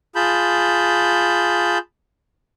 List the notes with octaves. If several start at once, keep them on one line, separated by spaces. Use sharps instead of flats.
F4 G#4 A5 B5 G6